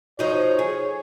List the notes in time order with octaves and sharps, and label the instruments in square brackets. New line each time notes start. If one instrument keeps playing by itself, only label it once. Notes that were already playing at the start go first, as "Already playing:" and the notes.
[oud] F3 D#4 F#4 [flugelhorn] C#5
[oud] G#4